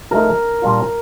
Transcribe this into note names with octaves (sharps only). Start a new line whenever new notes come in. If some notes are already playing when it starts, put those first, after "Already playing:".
F3 A3 D#4 A#4
A#2 G3 D4 F4